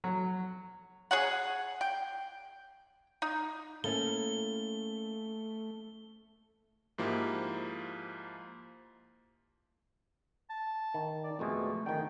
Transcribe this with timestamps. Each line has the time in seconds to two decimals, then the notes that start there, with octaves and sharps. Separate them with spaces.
0.04 F#3
1.11 G#4 C#5 F#5
1.81 G5
3.22 D#4
3.84 A3 A#3 C#4 E4 A4 G7
6.98 G#2 F3 A#3 E4 G4
10.50 A5
10.94 D#3
11.24 D5
11.39 F2 B2 G#3 A3
11.86 D3 D#3 G5